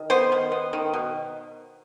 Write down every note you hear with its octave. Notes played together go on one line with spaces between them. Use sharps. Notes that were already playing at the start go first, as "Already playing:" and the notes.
Already playing: D#3
B3 C5
D#3
B3
D#3
B2